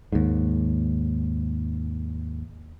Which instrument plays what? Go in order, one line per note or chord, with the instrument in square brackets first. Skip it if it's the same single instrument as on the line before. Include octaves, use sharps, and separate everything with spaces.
[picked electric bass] D#2 G#2